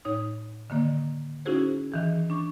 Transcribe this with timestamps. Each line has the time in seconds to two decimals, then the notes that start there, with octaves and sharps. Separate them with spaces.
0.05 A2 D#4 C#5 D#6
0.70 D3 D#3 A#3 D5
1.45 C#4 D#4 E4 F#4 G#4 C5
1.92 D#3 E3 G#4
2.30 D4 C#6